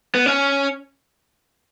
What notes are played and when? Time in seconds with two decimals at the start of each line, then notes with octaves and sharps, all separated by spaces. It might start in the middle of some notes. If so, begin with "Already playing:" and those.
0.15 B3
0.26 C#4